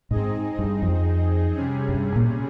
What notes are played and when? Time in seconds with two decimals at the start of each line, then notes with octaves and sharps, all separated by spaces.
0.10 G#2 C4 D#4 G#4 D#5
0.59 G2
0.82 F2
1.54 C3 G3 C#4 G#4
1.89 G2
2.16 A#2